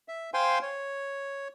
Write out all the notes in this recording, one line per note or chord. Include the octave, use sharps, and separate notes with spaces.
E5
C5 F5 G5 G#5 C6
C#5